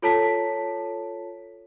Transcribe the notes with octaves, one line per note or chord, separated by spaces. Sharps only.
F4 A4 C#5 A5 A#5 B6